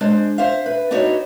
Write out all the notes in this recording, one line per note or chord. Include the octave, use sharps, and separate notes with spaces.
G#3 D4 C5
C5 E5 F5
B4
B3 D4 D#4 F#4 C#5